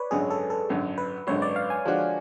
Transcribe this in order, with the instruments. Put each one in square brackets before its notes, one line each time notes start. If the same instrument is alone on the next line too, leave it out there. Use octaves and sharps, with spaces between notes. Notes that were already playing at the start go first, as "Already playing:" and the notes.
Already playing: [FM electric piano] B4 C#5 D5
[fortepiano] G#1 F#2 D3 G#3 [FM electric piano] G#4
[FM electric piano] A4
A4
[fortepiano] G#1 F#2 D3 G#3
[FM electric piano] B4
[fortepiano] G#1 F#2 D3 G#3 [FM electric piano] C#5
[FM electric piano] D5
F5
G#5
[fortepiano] D3 F3 G#3 D4 F#4